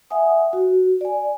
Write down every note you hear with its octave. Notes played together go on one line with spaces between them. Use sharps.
E5 F#5 G#5 D#6
F#4
D5 G#5